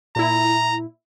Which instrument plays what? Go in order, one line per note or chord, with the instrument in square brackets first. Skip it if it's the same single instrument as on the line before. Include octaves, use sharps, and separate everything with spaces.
[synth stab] A#2 E4 [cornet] A#5